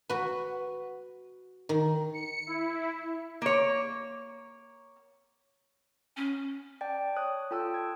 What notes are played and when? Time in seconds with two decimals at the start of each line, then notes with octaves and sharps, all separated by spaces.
0.09 F#4 B4
1.69 D#3
2.13 C#7
2.47 E4
3.42 A#3 C#5
6.16 C#4
6.81 D5 G5 A5
7.16 C#5 D#6 F#6
7.51 F4 A4 G5 A5 D#6 E6
7.74 G#6